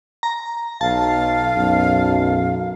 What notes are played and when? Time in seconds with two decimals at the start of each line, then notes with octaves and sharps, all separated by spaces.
0.23 A#5
0.81 B1 F5 A5
1.56 B1 F#2